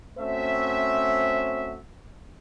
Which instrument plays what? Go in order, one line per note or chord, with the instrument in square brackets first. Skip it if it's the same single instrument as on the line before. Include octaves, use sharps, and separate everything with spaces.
[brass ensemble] A3 C4 C#4 F#4 C5 E5